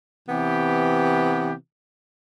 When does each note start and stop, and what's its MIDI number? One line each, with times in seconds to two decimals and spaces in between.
0.28 1.53 48
0.28 1.53 52
0.28 1.53 59
0.28 1.53 67